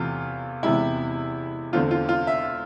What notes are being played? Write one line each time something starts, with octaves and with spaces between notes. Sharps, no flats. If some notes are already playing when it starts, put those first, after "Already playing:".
Already playing: E2 C3 E3 A3 F4
E2 C3 G#3 E4
E2 D3 A3 C4 F4
F4
F4
E5